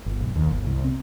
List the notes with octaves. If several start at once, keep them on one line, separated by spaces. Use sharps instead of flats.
G1
B1
D#2
G1
C2
C4